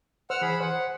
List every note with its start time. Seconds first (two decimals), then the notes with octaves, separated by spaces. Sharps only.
0.30 C5 F#5 E6 F6
0.41 E3 G#4 B5
0.61 C5 F#5